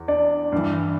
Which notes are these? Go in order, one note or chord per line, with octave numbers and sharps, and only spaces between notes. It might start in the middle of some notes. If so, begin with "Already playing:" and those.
Already playing: E2
D4 D5
G2 E3